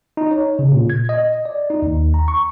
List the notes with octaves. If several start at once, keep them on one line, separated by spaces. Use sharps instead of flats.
D#4
C#5
C#3
A#2
G#6
D#5
D5
D#4
D#2
A#5
C#6